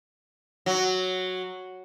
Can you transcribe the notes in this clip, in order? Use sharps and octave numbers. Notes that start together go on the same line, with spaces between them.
F#3